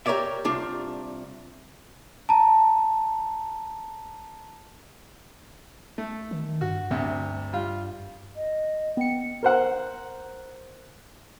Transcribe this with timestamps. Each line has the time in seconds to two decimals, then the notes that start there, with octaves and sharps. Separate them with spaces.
0.06 G4 A#4 B4 C#5 D5 E5
0.45 C2 D4 F4
2.29 A5 A#5
5.98 A3
6.31 D#3
6.61 G2 F#4
6.91 D2 G2 C3
7.53 G3 F4
8.36 D#5
8.97 B3 G5 C#7
9.43 A#4 C5 F#5